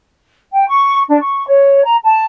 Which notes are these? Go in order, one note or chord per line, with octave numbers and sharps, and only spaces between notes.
G5
C#6
D4
C#6
C#5
A#5
A5